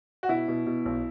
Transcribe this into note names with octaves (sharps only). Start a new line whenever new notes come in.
F#4
B2 E4
B2
B2
B1